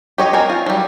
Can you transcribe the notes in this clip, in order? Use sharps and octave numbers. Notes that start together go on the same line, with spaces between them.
G4 C#5 D#5
C4 A#4 G#5
F4
F#3 G3